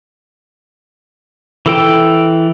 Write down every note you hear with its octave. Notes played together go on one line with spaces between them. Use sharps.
E3 A4 G5